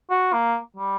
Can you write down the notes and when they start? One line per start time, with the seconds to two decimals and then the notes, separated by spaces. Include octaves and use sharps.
0.10 F#4
0.33 A#3
0.76 G3